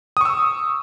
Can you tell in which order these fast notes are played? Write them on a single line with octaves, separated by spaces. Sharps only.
D#6 C#6 E6